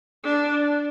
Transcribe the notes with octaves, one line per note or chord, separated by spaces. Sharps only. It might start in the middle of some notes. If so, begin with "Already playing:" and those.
D4